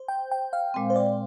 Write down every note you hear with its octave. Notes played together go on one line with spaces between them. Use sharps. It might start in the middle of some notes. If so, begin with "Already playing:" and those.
Already playing: C5
G5
G5
F5
A#2 G#3 C4
C5
D5